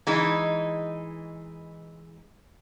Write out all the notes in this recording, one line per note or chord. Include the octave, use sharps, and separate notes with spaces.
E3 G#3 D#4